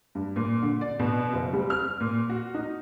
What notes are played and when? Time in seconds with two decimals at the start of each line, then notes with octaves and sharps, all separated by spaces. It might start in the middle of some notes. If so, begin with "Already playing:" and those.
0.15 G2
0.36 A#2
0.63 D3
0.81 D5
0.99 B2
1.33 F#1
1.53 G3
1.70 F6
2.00 A#2
2.30 F#4
2.55 D#4